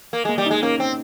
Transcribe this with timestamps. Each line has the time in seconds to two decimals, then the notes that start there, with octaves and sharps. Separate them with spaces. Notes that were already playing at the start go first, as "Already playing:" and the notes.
0.13 A#3
0.25 G#3
0.29 A#3
0.38 G3
0.46 G#3 D#4
0.63 A#3 C#4
0.80 C4